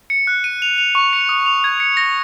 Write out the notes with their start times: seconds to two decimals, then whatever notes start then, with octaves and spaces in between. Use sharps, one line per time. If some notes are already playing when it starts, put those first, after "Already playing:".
0.10 C#7
0.27 F#6
0.44 D#7
0.62 F7
0.78 F7
0.95 C#6
1.13 C#7
1.29 D#6
1.46 F7
1.64 G#6
1.80 C#7
1.97 A#6